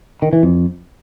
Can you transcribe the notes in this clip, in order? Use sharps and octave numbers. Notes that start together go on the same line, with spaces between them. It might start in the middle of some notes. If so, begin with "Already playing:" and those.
D#3
E3
F2